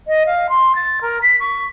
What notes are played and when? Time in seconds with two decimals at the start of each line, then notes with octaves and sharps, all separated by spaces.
0.07 D#5
0.26 F5
0.49 C6
0.75 A6
1.01 A#4
1.22 B6
1.40 C#6